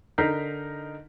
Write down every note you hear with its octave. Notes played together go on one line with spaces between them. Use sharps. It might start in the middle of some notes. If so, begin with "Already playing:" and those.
D3 D#4 A#4 G6 B6 C7